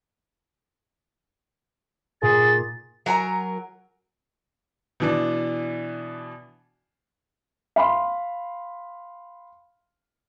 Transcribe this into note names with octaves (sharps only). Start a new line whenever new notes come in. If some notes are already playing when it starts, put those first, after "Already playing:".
A#2 G#4 A6
F#3 A#4 G#5 A#5
B2 E3 D4
F5 B5 C6